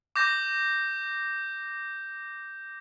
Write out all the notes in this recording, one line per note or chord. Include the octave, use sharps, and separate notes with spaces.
D6 G6 A#6